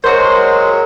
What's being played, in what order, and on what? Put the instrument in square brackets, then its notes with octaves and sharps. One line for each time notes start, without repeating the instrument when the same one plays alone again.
[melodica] F#3 G#3 [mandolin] F#4 C5 [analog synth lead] A#4